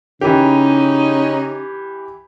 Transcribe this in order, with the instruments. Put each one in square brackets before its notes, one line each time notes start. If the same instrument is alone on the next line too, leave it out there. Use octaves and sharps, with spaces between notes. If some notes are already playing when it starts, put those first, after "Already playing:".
[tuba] C#3 [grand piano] E3 G4 [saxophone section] C#4 D#4